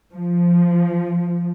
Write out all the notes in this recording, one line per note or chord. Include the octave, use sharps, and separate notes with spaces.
F3